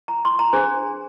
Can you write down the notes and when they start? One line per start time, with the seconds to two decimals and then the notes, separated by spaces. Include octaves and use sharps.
0.08 A#5
0.25 C6
0.39 A#5
0.53 D4 G#4 C5 G#5